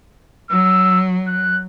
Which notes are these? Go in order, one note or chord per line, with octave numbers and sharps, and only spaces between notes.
F#3 E6
F#6